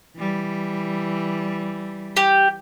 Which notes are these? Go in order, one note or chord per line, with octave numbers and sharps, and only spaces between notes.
E3 G3
G4